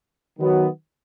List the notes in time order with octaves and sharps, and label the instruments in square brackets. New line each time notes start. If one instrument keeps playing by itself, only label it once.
[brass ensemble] D#3 F#3 B3